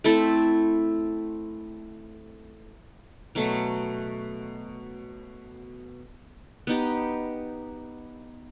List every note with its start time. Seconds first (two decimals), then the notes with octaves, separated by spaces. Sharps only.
0.04 A3 C4 E4 A4
3.35 B2 F#3 A3
6.67 B3 D#4 G4